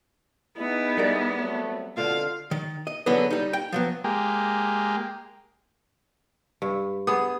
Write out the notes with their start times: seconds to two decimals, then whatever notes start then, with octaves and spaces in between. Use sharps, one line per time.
0.57 B3 D#4 E4 G#4
0.97 G3 A#4 D5
1.38 F#3 A3 C4
1.97 B2 D3 C4 F4 F5
2.51 D#3
2.87 D#5
3.06 F#2 D3 E3 F#3 G#3 B3
3.31 G3 D#4
3.53 G5
3.72 F3 F#3 B3
4.04 G#3 A#3 G4
6.62 G2
7.07 B3 G#4 D#6